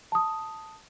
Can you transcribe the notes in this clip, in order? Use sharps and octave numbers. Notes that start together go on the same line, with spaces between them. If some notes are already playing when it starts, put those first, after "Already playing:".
A5 D#6